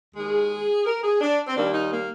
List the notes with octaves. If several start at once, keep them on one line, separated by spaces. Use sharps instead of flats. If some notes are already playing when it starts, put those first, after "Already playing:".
D#2 D#3 G#3 G#4
A#4
G#4
D4
C4
D#2 D#3 G3 A#3 D4
D#4
A#3